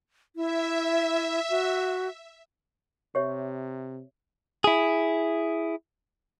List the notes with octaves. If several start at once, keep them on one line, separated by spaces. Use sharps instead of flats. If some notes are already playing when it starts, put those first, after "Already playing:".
E4 E5
F#4
C3 G4 C#5 E5
E4 G#4